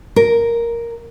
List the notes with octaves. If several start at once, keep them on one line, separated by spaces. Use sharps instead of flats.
A#4